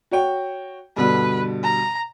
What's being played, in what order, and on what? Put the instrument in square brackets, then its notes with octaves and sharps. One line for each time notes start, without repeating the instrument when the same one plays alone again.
[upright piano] F#4 C#5 G5
[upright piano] G2 B2 D3 [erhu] B4
[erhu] A#5